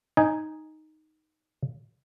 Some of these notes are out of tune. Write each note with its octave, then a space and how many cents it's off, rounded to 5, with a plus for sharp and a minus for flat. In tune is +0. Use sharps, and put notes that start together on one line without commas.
D#4 +0 G#5 +0